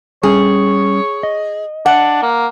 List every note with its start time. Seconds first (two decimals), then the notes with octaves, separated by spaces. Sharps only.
0.23 G3 C#4 G#4 C#5
1.23 D#5
1.86 D4 F#5
2.23 A#3